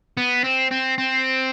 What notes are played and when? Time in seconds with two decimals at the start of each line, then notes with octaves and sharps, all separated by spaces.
0.17 B3
0.44 C4
0.71 C4
0.98 C4